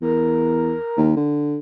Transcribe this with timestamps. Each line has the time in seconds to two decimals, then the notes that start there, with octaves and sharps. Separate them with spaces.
0.02 E2 A#4
0.97 D#2
1.17 D3